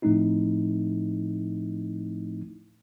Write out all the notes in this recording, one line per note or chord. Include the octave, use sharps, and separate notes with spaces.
A2 F3 A3 C4 D#4 E4